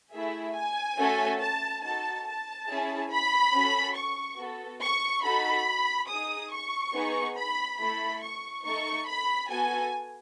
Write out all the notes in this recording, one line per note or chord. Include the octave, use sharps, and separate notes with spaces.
A3 E4 G#4 E5
G#5
A3 C#4 F#4 A4
A5
D#4 F#4 A4 A5
A5
C#4 E4 G#4
B5
C#4 F#4 A4
C#6
B3 F#4 A4
C#6
D#4 F#4 A4 B5
D#4 G#4 D#6
C#6
B3 D#4 G#4
B5
A3 E4 A4 B5
C#6
A3 D#4 A4 C#6
B5
B3 F#4 A4 G#5